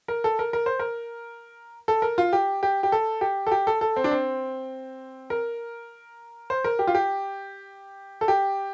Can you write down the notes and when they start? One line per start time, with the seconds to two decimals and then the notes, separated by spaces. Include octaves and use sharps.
0.08 A#4
0.24 A4
0.39 A#4
0.53 A#4
0.66 C5
0.79 A#4
1.88 A4
2.02 A#4
2.18 F4
2.33 G4
2.63 G4
2.83 G4
2.92 A4
3.21 G4
3.47 A4
3.51 G4
3.67 A4
3.81 A4
3.96 C4
4.04 D4
4.11 C4
5.30 A#4
6.50 C5
6.64 A#4
6.79 G4
6.87 F4
6.95 G4
8.21 A4
8.28 G4